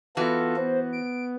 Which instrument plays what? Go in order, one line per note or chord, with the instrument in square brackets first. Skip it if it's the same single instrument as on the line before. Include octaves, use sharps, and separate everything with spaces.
[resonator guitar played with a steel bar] E3 F#4 B4 [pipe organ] B3 F4 A4
[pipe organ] B3 [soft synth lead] C5
[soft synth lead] D7